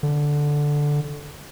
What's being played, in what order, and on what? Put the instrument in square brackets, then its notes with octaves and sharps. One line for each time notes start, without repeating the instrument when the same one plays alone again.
[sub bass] D3